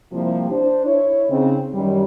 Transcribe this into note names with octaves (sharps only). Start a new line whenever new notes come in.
C3 F3 G3 A#3 E4 F4
D4 C5
E4 C#5
C#3 C4 D#4
F#2 D#3 G3